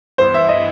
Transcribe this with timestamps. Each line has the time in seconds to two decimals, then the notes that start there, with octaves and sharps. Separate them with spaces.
0.18 G2 E3 B3 E4 C5
0.34 E5
0.49 D#5